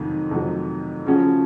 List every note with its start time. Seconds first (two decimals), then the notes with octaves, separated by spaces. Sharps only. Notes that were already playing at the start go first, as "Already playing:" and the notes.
Already playing: F2 C3 D#3 F#3 A3
0.31 F2 C3 D#3 F#3 A3
1.06 C#3 F3 A3 C#4 F#4